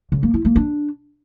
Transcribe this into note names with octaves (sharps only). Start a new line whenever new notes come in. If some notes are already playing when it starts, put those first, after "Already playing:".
C#3
A#3
E4
A#3
D4